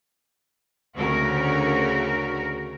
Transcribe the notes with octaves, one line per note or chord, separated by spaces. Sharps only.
D2 C#3 F#4 A#4